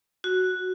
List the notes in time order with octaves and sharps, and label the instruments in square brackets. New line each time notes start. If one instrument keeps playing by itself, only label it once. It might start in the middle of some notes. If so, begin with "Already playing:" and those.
[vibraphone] F#4